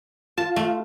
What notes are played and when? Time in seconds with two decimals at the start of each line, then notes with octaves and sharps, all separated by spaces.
0.38 F4 A5
0.56 A3